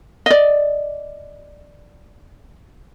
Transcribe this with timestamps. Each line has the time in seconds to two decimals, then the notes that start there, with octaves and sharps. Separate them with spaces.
0.26 D5 D#5